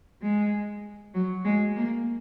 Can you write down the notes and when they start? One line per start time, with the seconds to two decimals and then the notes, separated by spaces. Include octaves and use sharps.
0.22 G#3
1.14 F#3
1.45 G#3
1.76 A#3